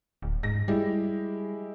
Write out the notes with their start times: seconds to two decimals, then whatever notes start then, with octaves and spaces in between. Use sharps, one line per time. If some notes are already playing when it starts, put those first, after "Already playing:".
0.22 D1
0.43 G#2 A#6
0.68 G3 G#3 E4 G4